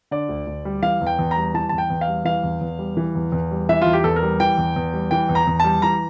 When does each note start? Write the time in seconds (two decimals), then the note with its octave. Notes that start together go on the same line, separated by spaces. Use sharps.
0.11 D3 D5
0.29 D2
0.47 D2
0.65 G3
0.83 E3 F5
1.01 E2
1.07 G5
1.19 E2
1.31 A#5
1.37 G3
1.54 E3 A5
1.69 E2 A5
1.78 G5
1.90 E2
2.01 F5
2.08 G3
2.25 E3 F5
2.44 E2
2.61 E2
2.79 G3
2.97 E3
3.15 E2
3.32 E2
3.51 G3
3.69 E3 E5
3.82 E2 F4
3.93 G4
4.04 E2 A4
4.16 A#4
4.23 G3
4.40 E3 G5
4.58 E2
4.76 E2
4.94 G3
5.11 E3 G5
5.29 E2
5.35 A#5
5.47 E2
5.60 G3 A5
5.82 E3 A#5